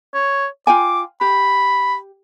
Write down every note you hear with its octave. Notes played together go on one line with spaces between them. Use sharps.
C#5
F4 G5 G#5 D6
G4 B5